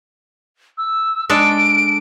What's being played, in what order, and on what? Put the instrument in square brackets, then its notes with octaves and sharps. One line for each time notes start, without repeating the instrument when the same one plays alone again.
[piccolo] E6
[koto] G#3 D4 A4 [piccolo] D7